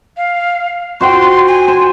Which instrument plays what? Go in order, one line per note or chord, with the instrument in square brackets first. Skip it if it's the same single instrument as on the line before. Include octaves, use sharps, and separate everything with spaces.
[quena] F5
[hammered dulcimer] F#4 C5 G5 [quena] C6
[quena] G#5
[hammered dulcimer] C5